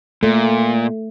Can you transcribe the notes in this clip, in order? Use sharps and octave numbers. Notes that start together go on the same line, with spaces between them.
A#2 A3